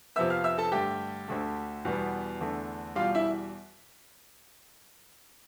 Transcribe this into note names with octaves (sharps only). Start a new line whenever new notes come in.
F2 C3 F3 B3 E5 E6
F5 F6
E5 E6
A4 A5
G2 D3 A3 G4 G5
D2 D3 A3
E2 B2 G3 B3
E2 D3 A3
E2 B2 G3 F4 F5
E4 E5